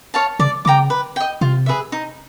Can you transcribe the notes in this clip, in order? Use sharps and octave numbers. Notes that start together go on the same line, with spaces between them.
C#5 F5 A5
C#3 D5
C#3 G5 A#5 D6
B4
D#5 G5
C3 F4
G#4 B4 E5
D#4